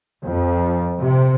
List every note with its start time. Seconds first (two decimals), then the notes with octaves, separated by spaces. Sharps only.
0.21 F2
0.97 C3